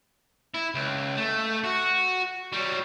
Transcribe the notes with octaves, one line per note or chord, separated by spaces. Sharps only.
E4
C#2
A3
F#4
F#3 G3